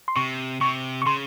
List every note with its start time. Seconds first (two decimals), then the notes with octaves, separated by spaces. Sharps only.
0.08 C6
0.16 C3 C#6
0.61 C3 C#6
1.02 C#6
1.06 C#3 C6